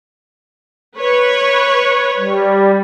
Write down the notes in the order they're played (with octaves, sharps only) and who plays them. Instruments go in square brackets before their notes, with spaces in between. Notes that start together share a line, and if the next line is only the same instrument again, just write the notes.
[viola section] B4 C#5
[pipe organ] G3